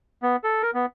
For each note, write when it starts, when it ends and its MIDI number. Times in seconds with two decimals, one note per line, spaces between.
0.23 0.36 59
0.44 0.62 69
0.63 0.71 70
0.74 0.86 59